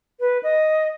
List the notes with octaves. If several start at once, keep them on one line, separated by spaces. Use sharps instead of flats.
B4
D#5